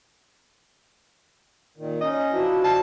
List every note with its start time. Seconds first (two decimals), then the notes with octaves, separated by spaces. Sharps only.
1.77 A#2 D#3
2.01 C#4 D#4 D#5
2.32 F3 D4 E4 F#4
2.64 A5